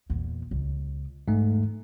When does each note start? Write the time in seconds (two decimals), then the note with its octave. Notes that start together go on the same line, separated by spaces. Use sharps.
0.10 E2 A#2
0.51 C#2
1.28 E2 G#2 A3